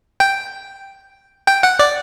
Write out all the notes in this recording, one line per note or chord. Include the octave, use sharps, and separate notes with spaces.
G5
G5
F#5
D5